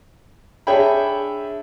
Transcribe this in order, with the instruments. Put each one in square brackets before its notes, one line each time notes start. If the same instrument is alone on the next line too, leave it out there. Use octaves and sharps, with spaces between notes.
[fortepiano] D4 G#4 C#5 E5 G5 B5